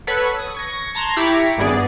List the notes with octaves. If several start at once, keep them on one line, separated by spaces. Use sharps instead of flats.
A4 B4 C#5 F#5 B5 G#6
D#6
C#6 G#6 A#6
A5 A#5 C6 F#6 G#6
E4 G4 A#5 B5 C#6 D6
G#1 G2 B3 G#4 D5